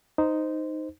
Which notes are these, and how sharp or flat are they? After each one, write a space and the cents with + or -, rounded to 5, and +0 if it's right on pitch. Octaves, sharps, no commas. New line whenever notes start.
D#4 +0 C5 -15